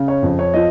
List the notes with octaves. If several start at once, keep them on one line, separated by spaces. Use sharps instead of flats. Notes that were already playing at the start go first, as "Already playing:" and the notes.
Already playing: C#3
C#5
F2
C#5
F3 D#5